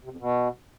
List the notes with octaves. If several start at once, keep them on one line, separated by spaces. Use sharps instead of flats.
C3
F2
B2